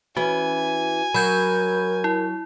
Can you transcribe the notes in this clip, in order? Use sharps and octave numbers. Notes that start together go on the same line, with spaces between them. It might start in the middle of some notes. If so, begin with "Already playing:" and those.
E3 C#4 F#4 G#5
F#3 A#4 B5 G6 G#6
E4